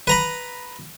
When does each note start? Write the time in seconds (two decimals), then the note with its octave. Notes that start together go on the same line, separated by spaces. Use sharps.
0.07 B4 A#5 B5